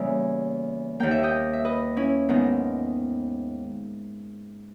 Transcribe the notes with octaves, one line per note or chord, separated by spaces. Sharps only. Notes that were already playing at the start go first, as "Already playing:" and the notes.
Already playing: E2 C#3 G3 A#3 E5 G#5
D#2 D#3 A#3 G5
E5
D#5 G5
E5
B4 D#5
C#4 E4
G#2 D#3 G#3 B3